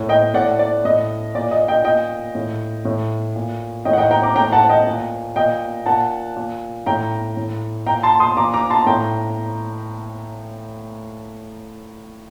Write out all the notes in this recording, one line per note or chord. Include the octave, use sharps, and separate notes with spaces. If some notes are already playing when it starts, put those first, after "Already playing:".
Already playing: A2
D#5 G5
A2 D5 F#5
D5
A2 D#5
A#2 D5
D#5
D#5 G5
A#2 D#5 G5
A2
A2
A#2
A2 D#5 G5
F#5
D#5 G5
G5 A#5
A#5 D6
A2 G5 A#5
F#5 A5
D#5 G5
A#2
A#2 D#5 G5
A#2 F#5 A5
A#2
A2 G5 A#5
A2
A#2 G5 A#5
A5 C6
C6 D#6
A#2 A#5 D6
A#5 D6
A5 C6
A2 G5 A#5